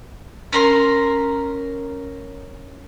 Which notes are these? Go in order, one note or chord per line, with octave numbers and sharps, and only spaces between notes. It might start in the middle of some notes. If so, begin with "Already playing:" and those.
C#4 A#4 C6